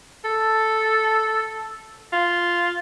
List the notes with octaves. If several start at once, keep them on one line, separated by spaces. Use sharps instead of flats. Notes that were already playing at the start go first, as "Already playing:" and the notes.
A4
F4